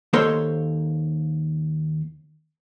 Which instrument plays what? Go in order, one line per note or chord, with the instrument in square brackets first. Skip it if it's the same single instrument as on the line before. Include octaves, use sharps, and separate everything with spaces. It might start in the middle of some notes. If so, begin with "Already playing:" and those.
[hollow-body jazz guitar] D#2 A#3 A4 C5 C#5 C6